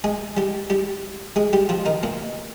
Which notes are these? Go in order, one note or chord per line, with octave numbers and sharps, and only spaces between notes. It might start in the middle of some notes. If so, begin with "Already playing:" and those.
G#3 G#4
G3 G4
G3 G4
G#3 G#4
G3 G4
F3 F4
D#3 D#4
A#2 A#3